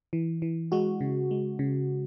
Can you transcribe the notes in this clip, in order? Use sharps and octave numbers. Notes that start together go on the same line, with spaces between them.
E3
E3
G#3 F#4
C#3
G#3
C#3